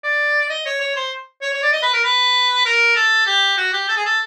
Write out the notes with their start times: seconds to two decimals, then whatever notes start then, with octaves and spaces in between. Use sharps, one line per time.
0.04 D5
0.50 D#5
0.66 C#5
0.81 C#5
0.96 C5
1.42 C#5
1.53 C#5
1.63 D5
1.73 D#5
1.83 B4
1.93 A#4
2.04 B4
2.66 A#4
2.96 A4
3.26 G4
3.57 F#4
3.73 G4
3.89 A4
3.97 G#4
4.05 A4